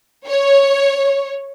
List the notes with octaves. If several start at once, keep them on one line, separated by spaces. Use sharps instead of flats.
C#5